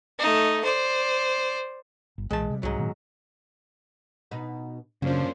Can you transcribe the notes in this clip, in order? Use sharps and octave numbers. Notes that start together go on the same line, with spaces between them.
A3 D#4
C5 D5
G1
B1 A#2 E3 G#3 A5
C3 G3
C2 G#2 F#3
A#2 D#3 B3
B2 D#4 B4
F#2 C#3 F3 A#3 C#4 D4 C5